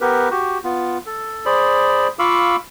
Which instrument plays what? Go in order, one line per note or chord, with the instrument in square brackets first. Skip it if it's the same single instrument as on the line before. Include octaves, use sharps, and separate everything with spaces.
[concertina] B3 G4 A#4 B4
F#4 G4
B3 F4
A4
G#4 C5 D5 B5
F4 F5 B5 C#6 D6 E6